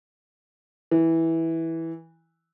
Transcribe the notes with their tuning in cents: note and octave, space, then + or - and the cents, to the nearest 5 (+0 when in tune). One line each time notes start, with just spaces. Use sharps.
E3 -10